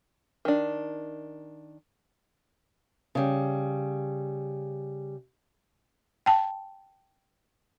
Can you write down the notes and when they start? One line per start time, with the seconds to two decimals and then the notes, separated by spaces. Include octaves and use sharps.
0.45 D#3 D4
3.15 C#3 G3
6.26 G5 A5